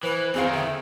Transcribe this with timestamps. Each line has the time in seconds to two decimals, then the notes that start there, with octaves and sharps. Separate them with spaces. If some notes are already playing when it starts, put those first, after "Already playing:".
0.03 E3 B4 C5
0.34 E2 D#3 E3 C4 G#4 F5
0.53 D3 E5 G5